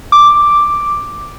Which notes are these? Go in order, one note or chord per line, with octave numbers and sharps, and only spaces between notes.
D6